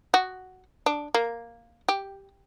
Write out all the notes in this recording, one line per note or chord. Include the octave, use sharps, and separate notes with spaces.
F#4
D4
A#3
G4